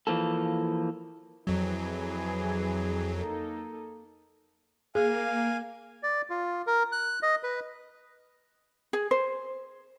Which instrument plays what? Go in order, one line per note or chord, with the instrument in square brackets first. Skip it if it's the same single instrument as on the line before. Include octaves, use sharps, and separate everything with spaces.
[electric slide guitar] E3 F3 A#3 A4
[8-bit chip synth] F2 F#3 [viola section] E3 G#4
[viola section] A#3 D#4 A4
[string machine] A#3 [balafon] G#4 [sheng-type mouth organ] F5 G#5
[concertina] D5
F4
A#4
F#6
D#5
B4
[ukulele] G#4
C5